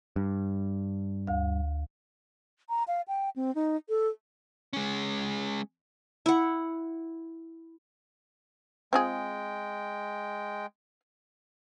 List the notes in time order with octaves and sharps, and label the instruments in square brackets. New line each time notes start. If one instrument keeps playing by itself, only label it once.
[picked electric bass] G2
[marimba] D2 F5
[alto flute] A#5
F5
G5
C4
D#4
A4
[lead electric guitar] G#3 C#4
[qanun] E4 F#5
[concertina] G#3 G5 [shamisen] C4 F4 G#4